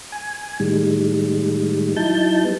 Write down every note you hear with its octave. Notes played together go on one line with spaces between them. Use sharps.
G#5
A2 D#3 G3 G#3
F#3 D#4 E4 A5 G6
G3 B3